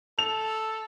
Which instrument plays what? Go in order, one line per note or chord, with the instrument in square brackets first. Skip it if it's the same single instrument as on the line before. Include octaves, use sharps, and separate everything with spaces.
[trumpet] A4 [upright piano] F7